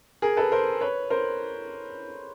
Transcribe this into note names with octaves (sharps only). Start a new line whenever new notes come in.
G#4 A#4
A4 B4
A#4 C5
B4 C#5
A#4 C5